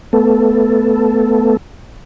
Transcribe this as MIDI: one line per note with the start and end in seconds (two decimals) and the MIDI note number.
0.13 1.57 57
0.13 1.57 59
0.13 1.57 69